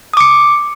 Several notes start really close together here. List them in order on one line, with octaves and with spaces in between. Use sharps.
D#6 D6 C#7